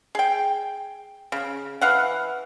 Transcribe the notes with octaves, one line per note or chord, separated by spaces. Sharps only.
G#4 G5
C#3
E3 F5 F#5